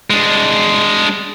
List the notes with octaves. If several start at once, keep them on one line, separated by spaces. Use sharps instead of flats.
G#3 D4